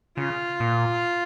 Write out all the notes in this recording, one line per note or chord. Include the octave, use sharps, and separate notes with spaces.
C#3 F4
A#2